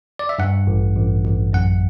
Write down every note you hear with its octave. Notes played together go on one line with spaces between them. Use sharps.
D5
E5
G2 F#5
A1
A1
A1
F#2 F#5